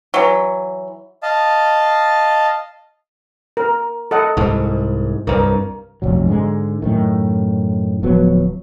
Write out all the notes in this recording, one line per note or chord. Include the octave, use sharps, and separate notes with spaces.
E3 F#3
D#5 F5 A5
A#4
A4 D#5 F#5
C2 G#2
C2 G2 A#4
F1 B1 F#3
G#2 D3 F3 G#3
F#2 A2 D#3
D1 F3 F#3 B3